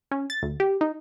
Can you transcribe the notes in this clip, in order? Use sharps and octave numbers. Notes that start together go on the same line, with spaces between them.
C#4
A6
D2
G4
D#4